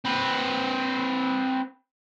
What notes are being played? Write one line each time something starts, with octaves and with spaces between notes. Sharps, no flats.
C4 B4